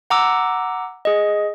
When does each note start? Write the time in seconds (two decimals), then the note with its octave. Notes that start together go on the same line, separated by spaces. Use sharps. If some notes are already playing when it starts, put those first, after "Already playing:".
0.10 F#5 A#5 D6 E6
1.05 G#4 D#5